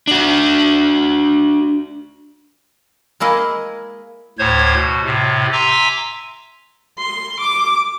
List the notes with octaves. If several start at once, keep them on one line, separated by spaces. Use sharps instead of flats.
D4 F#4
G#3 A#3 E4 G#4 D#5
D2 A2 C5 C#5 G#6
B2
A2 C3
E5 G#5 A#5 C6 D6 E6
C6
D6